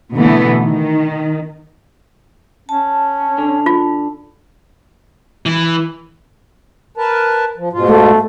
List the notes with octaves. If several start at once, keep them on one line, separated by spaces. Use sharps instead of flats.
B2 D3 E3 A3 B3
D#3
C#4 A5
D3
F4
E3
A#4 B4 A5
F3
G#2 B2 F4
A3